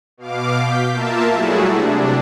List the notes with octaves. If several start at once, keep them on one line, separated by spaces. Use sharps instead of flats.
B2 F5 D6
G6 B6
A#3 F4 A#4 E5 A5
F#3 G3 A3 E4 F#4 G#4
C3 D4